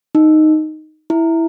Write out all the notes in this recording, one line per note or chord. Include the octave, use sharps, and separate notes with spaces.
D#4
E4